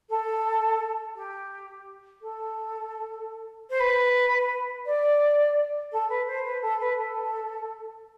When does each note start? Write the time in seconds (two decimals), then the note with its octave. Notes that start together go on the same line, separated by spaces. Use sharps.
0.09 A4
1.15 G4
2.21 A4
3.69 C5
3.80 B4
4.85 D5
5.92 A4
6.09 B4
6.27 C5
6.44 B4
6.61 A4
6.80 B4
6.97 A4